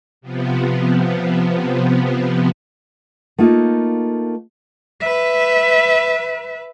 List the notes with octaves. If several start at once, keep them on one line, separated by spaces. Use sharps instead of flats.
C3 F3 B3
A3 A#3 D#4 F4
B4 E5